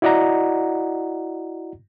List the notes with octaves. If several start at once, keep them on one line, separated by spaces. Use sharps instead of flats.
E4 F#4 D5 D#5 F#5 A#5